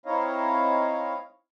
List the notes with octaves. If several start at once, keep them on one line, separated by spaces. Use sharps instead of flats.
C4 D#4 E4 C#5 D#5 F5